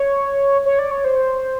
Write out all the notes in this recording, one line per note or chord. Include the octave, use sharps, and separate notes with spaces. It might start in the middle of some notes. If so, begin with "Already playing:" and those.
Already playing: C#5
C#5
D5
C#5
C5